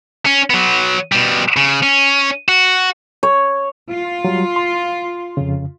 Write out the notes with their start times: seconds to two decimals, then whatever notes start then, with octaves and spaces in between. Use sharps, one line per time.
0.26 C#4
0.50 F#3 B3
1.12 B2 G3
1.56 C#3
1.83 C#4
2.48 F#4
3.23 C#5
3.91 F4
4.25 F#3 G3
4.56 C6
5.37 F2 C#3